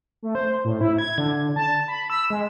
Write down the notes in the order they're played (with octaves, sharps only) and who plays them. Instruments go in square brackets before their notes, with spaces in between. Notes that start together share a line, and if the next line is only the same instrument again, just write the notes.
[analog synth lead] A3
C5
A2
E4
G#6
D3
A5
B5
E6
G#3